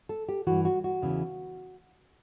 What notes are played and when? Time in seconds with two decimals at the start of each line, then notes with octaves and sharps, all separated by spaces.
0.09 A4
0.29 G4
0.47 G2 E3 F#4
0.65 F#4
0.84 F#4
1.02 E2 C#3 E3